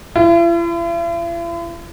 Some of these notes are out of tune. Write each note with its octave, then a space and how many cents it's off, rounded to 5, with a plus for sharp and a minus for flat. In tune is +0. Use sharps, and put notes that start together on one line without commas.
E4 +45